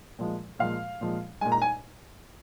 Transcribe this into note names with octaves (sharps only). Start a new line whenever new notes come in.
A#2 F3 G#3
A#2 F3 G#3 F5
A#2 F3 G#3
A#2 G#3 G#5
A#5
G#5